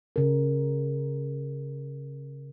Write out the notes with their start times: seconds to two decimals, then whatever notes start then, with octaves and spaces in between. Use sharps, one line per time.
0.16 C#3 A#4